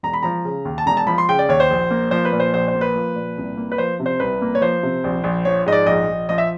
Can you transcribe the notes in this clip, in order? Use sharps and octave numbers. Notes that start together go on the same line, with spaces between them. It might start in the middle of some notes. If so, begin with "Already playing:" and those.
E1 A#5
B5
F3 A#5
C#3
D#2
A5
E1 A#5
A5
F3 B5
C6
C#3 G5
D5
D#2 C#5
C5
A#1
A#3
F3 C5
B4
A#2
C5
A#1 C5
C5
A#3
B4
F3
A#2
C2
A#3
B4
F3 C5
C3
C5
C2 B4
A#3
C#5
F3 C5
C3
A#1
A#1
F3 C#5
G#2 D#5
D5
A#1 D#5
A#1
F3 D#5
E5